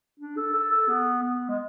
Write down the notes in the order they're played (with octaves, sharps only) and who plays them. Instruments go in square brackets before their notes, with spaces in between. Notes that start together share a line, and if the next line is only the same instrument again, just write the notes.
[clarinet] D4
A4
A4
A4
B3
B3
G#3